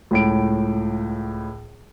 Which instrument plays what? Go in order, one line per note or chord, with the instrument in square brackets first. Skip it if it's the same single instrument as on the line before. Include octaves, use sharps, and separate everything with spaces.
[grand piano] C#2 A2 D7